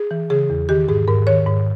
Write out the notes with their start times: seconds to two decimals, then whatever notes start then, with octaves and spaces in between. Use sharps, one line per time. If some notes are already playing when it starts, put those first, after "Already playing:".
Already playing: G#4
0.11 E3
0.30 C#3 G#4
0.50 E2
0.69 D#3 G4
0.88 G#2 G#4
1.08 G#2 A#4
1.27 D#3 C#5
1.47 G#2